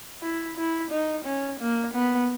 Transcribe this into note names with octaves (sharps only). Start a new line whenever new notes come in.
E4
E4
D#4
C#4
A#3
B3